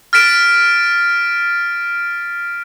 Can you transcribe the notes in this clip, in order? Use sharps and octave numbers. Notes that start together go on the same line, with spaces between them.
F6 A6 B6 D7 E7